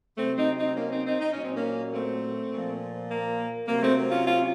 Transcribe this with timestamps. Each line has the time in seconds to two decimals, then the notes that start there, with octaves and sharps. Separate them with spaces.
0.17 C3 F#3 A3 C4
0.37 C4 D#4
0.57 C4 D#4
0.76 A#3 C#4
0.91 C4 D#4
1.05 C4 D#4
1.20 D#4
1.32 A#2 F#3 C#4
1.44 C4
1.55 A#3 C#4
1.92 A3 C4
2.52 A#2 F3
3.09 A#3
3.67 C3 F#3 A#3
3.82 A3 C4
4.11 C#4 F4
4.26 C#4 F4